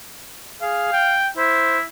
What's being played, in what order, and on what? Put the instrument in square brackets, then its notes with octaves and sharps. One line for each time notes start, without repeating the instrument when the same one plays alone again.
[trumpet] G#4 [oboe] F5
[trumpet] G5
[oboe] E4 [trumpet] C5